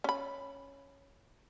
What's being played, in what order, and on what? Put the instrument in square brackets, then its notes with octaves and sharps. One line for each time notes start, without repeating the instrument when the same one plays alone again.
[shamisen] C#4 B5